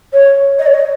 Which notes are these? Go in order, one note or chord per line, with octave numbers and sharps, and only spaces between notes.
C#5
D#5
C#5
D#5